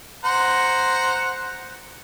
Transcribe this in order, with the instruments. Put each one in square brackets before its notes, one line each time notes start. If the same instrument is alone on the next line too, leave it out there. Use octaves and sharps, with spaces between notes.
[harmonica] C5 F#5 A#5